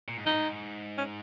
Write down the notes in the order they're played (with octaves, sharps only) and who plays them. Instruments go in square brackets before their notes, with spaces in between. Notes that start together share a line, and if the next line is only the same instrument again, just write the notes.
[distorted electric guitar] A#2
G#2
[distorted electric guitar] F2 [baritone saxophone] D#4
[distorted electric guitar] G#2
[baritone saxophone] C#4